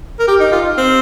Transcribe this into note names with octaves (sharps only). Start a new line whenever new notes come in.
A#4
G4
D#4
F4
C4